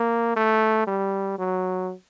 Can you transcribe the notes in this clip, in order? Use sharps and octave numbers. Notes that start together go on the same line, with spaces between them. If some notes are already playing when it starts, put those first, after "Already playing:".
Already playing: A#3
A3
G3
F#3